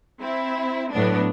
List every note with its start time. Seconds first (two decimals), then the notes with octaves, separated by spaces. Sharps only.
0.19 C4 E4
0.92 A2 F#3 B3 D4